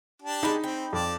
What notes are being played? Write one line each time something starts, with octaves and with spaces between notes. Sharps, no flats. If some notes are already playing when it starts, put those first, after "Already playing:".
D4 G4 A5
G#3 D#4 G5 B5
C4 G5
F2 D5 A5